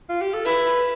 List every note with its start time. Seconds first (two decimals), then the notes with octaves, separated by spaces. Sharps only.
0.09 F4
0.21 G4
0.33 A4
0.45 E4 B4